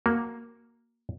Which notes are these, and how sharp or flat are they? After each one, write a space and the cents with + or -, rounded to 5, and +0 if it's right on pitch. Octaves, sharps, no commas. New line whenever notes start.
A#3 +0 F#4 +0